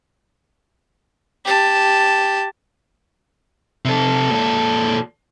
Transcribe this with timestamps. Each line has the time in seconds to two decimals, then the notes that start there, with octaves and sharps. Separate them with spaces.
1.45 G4 A5
3.85 C3 A4
4.31 A#2 A4